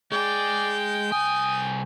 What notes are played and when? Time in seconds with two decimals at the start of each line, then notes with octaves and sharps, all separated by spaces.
0.12 G#3 G#4 D5 G5
1.12 C2 G#5 D#6